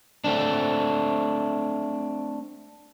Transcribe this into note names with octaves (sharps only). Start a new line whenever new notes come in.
A3 C4 D4